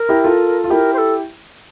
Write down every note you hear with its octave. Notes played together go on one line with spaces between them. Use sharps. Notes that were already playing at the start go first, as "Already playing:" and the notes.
Already playing: A#4
E4 G4
F4 A4
F4
E4 G4 A#4
C5
A4